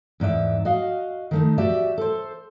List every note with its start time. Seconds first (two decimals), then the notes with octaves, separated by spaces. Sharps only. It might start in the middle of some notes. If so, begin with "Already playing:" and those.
0.20 E2 G#2 D5 E5
0.65 F#4 D#5 F5
1.31 D#3 A3 D#4
1.58 F#4 G4 D5 E5
1.98 A4 C5